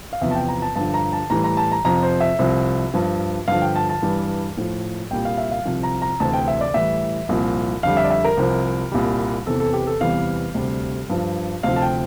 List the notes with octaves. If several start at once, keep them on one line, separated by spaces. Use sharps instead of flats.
F5
E2 C3 F3 E5
A5
G5
A#5
A5
G2 D3 F3 A5
A#5
A5
A2 E3 G3 A#5
A#5
A5
A#5
F2 C3 F3 A#5
C5
E5
C2 C3 F3
G2 F3
G2 D3 F3 F5
G5
A5
A5
G2 E3 G3
A2 F3
C2 A#2 G3 G5
F5
E5
F5
C2 C3 F3
A#5
A#5
D2 C3 E3 A5
G5
E5
D5
A2 E3 G3 E5
C2 A#2 F3
F2 D3 G3 F5
E5
D5
E5
A#4
C2 C3 F3
C2 A#2 G3
E2 C3 E3 A4
A4
G4
A4
E2 C3 E3 G3 F5
D2 C3 G3
G2 F3
D2 C3 F3 F5
A5
G5